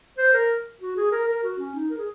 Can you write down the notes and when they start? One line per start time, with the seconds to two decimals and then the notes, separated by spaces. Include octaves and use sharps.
0.18 C5
0.33 A#4
0.81 F#4
0.96 G#4
1.12 A#4
1.28 A#4
1.44 F#4
1.59 C#4
1.75 D#4
1.90 A#4
1.98 G#4